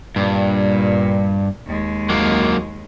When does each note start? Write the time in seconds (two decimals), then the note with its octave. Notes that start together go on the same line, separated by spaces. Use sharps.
0.16 G2 A#2
1.67 D#2 G#3
2.10 F#3 A#3